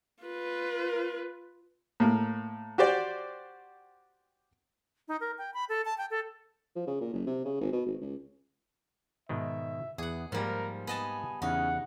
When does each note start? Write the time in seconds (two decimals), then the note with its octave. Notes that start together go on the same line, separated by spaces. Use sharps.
0.23 F4 B4
2.00 A2 A#3
2.78 F#4 G4 C5 D5
5.08 D#4
5.21 A#4
5.38 G5
5.54 B5
5.69 A4
5.85 A5
5.98 G5
6.11 A4
6.76 F3
6.87 C#3
7.01 A#2
7.13 F#1
7.27 C3
7.45 C#3
7.61 G#1
7.72 B2
7.86 G#1
8.02 C#2
9.29 G#2 B2 D#3 E5
9.98 E2 B3 G#4 F#5
10.32 G#2 F3 G3 A#3 G4 A#4
10.87 B3 D#5 G#5 A5
11.42 E2 C#3 C#4 D#4 F#5